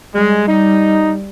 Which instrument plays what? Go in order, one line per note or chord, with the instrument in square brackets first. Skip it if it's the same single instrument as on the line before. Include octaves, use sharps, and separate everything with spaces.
[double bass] G3 [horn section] G#3
[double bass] G3 [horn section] D#4